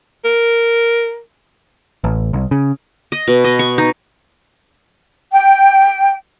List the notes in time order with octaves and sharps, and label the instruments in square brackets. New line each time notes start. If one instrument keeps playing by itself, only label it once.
[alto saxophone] A#4
[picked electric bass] A1
C2
C#3
[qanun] D#5
B2
D#5
C#6
D#4
[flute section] G5